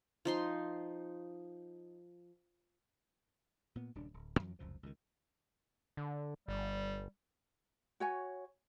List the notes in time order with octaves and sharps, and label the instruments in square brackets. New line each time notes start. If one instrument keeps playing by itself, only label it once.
[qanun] F3 D#4 C6
[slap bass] A#2 B3
D#1 G2 C#3 D4
D1
F2 E3 F#3
F1 C#2 F#2 F3
C#2 D3 D#3
[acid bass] D3
[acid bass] G1 [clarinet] G3
[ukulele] F#4 C#5 G#5